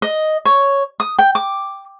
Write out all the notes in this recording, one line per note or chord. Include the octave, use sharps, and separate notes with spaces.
D#5
C#5
D#6
G5
D6